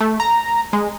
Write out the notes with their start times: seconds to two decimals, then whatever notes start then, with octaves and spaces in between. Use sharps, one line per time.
0.01 A3
0.20 A#5
0.73 G#3